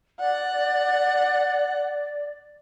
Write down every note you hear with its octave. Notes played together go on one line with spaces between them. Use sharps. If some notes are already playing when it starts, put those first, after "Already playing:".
D5 F#5